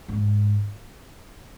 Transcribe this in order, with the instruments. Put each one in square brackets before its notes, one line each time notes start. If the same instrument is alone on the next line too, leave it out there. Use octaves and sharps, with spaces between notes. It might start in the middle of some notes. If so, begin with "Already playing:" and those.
[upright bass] G#2